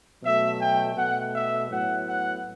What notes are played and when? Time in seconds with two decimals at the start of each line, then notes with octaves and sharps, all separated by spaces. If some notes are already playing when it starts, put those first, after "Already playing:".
0.22 B2 F#3 A3 E5
0.60 G5
0.96 B2 A3 F#5
1.34 E5
1.70 A2 F#3 B3 F#5
2.07 F#5